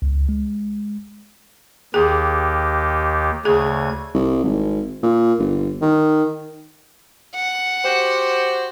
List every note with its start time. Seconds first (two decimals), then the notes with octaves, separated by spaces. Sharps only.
0.02 C#2
0.29 G#3
1.94 D#2 D#3 G4 G#4
3.45 D2 C#3 G#4 G#6
4.14 C2
4.44 G#1
5.03 A#2
5.39 G1
5.82 D#3
7.36 F#5
7.84 F#4 G4 C5